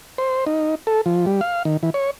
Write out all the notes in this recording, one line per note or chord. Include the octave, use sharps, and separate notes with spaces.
C5
D#4
A4
F3
G3
F5
D#3
E3
C#5